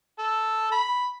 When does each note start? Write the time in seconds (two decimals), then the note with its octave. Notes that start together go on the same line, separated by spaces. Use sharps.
0.19 A4
0.72 B5